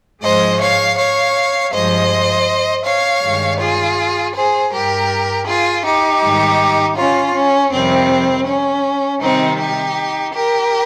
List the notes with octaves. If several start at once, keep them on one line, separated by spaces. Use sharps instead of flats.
G#2 F3 G#3 C5 D#5
C#5 F5
C#5 F5
G2 F3 G#3 C5 D#5
C#5 F5
G2 D#3 G#3
F4 G#4
G#4 C5
G2 G3 G4 A#4
F4 G#4
D#4 G4
G#2 D#3 G3
C#4 F4
C#4
F2 C3 D#3 G3 C4
C#4
C3 D#3 G3 C4 D#4
D#4 G4
G4 A#4